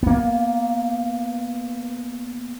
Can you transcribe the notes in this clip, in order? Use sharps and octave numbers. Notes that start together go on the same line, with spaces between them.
A#3 B3